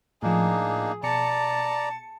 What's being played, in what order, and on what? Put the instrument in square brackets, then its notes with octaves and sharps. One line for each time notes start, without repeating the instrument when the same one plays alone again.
[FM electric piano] A2 F3 [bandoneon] A#3 D4 D#4 [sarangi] G#4
[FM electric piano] B2 C#7 [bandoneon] D5 A#5 [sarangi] A5